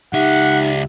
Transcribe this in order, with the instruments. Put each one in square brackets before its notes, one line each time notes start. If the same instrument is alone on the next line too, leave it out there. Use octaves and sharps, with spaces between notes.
[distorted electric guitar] C#2 E5 [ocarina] D#4 [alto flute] G4 [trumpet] F#5